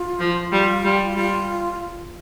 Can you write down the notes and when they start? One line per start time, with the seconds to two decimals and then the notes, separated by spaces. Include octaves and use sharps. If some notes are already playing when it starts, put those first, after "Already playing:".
Already playing: F4
0.19 F3
0.52 G3 F4
0.85 G3
1.11 F#4
1.16 G3 F4